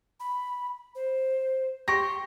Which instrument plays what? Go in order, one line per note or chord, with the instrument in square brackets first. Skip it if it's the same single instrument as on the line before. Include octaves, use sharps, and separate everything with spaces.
[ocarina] B5
C5
[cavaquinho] G4 [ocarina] C6 [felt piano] C#6 A#6